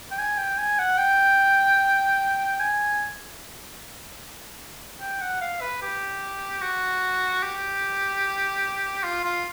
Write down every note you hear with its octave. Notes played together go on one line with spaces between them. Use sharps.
G5
G#5
G5
G#5
F#5
G5
G#5
G5
F#5
F5
B4
G4
F#4
G4
F4
F4